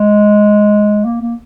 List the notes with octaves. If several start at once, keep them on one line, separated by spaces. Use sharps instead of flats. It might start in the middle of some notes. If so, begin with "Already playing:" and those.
Already playing: G#3
A#3
A#3